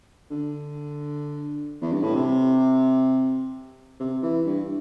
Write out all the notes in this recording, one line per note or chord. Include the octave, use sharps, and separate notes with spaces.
D3
E2
G2
A2
C3
C3
E3
G2